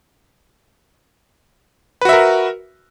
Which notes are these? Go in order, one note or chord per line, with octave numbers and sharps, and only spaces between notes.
F#4 A#4 B4 E5